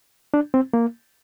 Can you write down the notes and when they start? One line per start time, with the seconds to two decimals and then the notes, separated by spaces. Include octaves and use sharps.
0.34 D4
0.54 C4
0.73 A#3